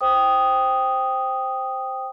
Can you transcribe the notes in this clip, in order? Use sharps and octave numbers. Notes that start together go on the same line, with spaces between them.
C5 G5 D#6